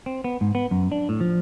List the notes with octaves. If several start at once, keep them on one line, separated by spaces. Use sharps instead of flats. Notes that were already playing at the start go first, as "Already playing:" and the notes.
C4
B3
G#2
B3
F#2
D4
A2
F3